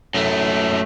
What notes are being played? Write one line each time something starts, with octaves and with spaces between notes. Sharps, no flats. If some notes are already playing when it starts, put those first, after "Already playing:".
F#2 A3